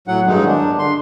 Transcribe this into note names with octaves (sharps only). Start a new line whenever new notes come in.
A2 F#3 F#5
G2 D#3 F#3 G#3 D#4
D4
D3 C6